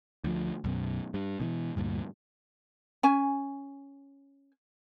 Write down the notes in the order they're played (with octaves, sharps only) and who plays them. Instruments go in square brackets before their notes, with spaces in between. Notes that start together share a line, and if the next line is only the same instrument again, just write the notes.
[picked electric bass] D2 F3
B1 F#2 B2
G2
B2 D3 E3
D2 G2 A#2
[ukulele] C#4 G#5